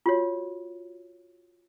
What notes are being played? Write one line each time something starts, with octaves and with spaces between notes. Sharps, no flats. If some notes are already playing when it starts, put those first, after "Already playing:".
F4 F#4 C#5